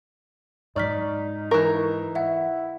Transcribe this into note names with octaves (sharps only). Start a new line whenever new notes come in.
G#2 F#3 D#4 D5 C#6 F6 B6
E3 A#4 C#6
E4 E5 F#5